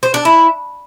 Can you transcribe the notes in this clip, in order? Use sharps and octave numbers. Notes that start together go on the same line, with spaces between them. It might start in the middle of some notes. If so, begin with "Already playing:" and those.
C5
D4
E4